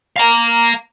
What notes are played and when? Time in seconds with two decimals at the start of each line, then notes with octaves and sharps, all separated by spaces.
0.16 F5 A#5